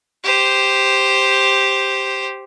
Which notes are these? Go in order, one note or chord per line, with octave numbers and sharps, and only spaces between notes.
G4 C5